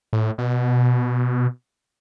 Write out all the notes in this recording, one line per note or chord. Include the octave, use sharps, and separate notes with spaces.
A2
B2